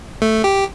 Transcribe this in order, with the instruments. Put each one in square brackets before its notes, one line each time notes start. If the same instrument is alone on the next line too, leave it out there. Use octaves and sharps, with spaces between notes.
[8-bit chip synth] A3
G4